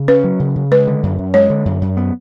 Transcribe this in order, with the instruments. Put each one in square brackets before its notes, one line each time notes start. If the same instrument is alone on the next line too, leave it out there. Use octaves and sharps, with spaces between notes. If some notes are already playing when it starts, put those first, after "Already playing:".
Already playing: [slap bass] C#3
[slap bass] C#4 [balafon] B4
[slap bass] F#3
C#3
C#3
[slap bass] G#3 [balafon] B4
[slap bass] D3
F#2
F#2
[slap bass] G#3 [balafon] C#5
[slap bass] D3
F#2
F#2
B3